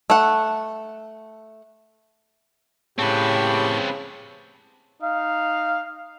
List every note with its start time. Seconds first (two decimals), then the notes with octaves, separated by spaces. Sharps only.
0.10 A3 F#5
2.98 A2 C#3 C4 G4 B4 A5 C#6
5.00 D#4 F5